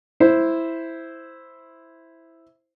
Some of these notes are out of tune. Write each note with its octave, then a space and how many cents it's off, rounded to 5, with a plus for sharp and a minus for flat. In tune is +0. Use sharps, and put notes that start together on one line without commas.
E4 +0 C5 +0